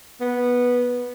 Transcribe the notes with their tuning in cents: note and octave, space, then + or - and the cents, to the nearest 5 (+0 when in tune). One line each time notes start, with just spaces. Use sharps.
B3 -10